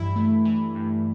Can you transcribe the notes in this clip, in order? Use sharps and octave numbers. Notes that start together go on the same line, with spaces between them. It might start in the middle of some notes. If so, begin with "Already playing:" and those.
Already playing: G2 E3 E4
A3
E3
G2